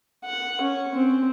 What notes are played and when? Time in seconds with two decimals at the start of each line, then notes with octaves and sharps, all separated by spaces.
0.25 F#5
0.61 C#4
0.94 C4